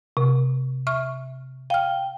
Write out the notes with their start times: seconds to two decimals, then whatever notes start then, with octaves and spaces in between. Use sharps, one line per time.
0.17 C3
0.87 E5 C#6 F6
1.70 F5 G5 F6